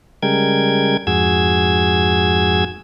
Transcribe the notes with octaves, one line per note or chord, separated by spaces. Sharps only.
C#3 G3 G#3 A#4 G5 G#6
F2 G#2 F#4 G#4 E6 G#6